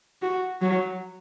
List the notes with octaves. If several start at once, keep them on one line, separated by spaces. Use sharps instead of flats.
F#4
F#3